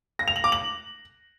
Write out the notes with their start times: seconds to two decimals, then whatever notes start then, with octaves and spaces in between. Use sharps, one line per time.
0.19 A#6
0.28 F7
0.36 F#7
0.44 D6
0.52 F#7